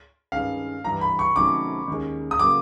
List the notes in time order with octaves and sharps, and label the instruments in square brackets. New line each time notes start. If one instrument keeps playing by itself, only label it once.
[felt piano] G2 D#3 G#3 C#4 [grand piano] F5
[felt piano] G2 E3 G3 [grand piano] A#5
[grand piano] B5
C#6
[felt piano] C3 D#3 F#3 A3 C#4 [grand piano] D6
[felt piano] D#2 D#3 G#3 C#4
[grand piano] D#6
[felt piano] C#3 F#3 A#3 [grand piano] D6